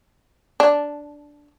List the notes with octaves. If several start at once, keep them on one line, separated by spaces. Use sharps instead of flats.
D4